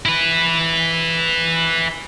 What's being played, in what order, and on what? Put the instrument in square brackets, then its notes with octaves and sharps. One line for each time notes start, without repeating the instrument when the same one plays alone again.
[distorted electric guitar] E4 B4